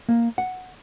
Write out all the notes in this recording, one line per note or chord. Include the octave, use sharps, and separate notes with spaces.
A#3
F#5